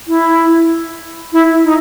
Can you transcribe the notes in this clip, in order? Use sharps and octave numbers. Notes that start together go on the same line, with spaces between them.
E4
E4
D#4